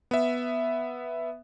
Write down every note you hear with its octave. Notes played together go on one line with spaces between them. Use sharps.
B3 E5